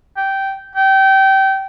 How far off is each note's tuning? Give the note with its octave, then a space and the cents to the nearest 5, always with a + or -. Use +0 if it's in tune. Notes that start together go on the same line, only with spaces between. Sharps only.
G5 -10
G5 -25